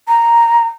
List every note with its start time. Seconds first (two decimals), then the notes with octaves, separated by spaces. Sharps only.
0.08 A#5